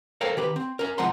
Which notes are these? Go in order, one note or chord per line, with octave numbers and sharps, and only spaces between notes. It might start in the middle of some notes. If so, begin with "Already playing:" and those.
A4 A#4 C5 C#5 F5 G5
D#3 G4 B4
C4
C#4 A#4
C2 F3 G#3 F#5 A#5 C6